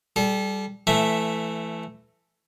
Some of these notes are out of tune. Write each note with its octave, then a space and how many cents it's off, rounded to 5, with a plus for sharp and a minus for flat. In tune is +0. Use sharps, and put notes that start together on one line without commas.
G3 +0 A4 -35
E3 +20 A3 +0 E5 +0